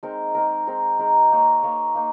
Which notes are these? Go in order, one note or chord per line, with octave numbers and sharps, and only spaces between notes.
G#3 C4 D#4 A#4
G#3 C4 D#4 A#4
G#3 C4 D#4 A#4
G#3 C4 D#4 A#4
A#3 D#4 A#4 C#5
A#3 D#4 A#4 C#5
A#3 D#4